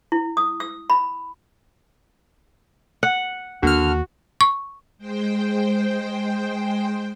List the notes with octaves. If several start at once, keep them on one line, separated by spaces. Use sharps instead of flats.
E4
D#6
E6
B5
F#5
D#2 D3 A#3 F#4 F6
C#6
G#3 C5 G5